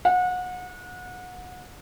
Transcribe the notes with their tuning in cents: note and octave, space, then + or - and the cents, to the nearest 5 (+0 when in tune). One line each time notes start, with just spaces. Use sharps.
F#5 -30